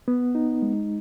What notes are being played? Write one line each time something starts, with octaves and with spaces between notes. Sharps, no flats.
B3
D#4
G#3